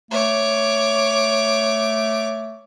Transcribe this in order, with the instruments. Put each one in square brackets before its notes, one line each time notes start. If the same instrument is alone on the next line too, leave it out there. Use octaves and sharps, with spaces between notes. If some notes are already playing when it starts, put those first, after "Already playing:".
[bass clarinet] A3 [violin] C#5 D6